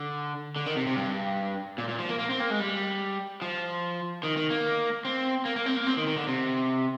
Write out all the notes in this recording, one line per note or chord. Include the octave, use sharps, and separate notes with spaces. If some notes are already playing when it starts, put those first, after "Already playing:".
Already playing: D3
D3
D#3
C3
C3
G2
A#2
A#2
F3
A#3
A#3
C4
A#3
G#3
G3
F3
D#3
D#3
A#3
C4
A#3
A#3
C4
A#3
C4
D#3
D#3
D3
C3